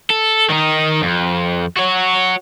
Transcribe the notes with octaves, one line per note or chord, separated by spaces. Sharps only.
A4
D#3 D#4
F2
F#4 C#5